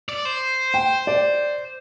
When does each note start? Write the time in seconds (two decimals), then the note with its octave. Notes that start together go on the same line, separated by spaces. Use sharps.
0.09 D5
0.25 C5
0.74 G5
1.07 D5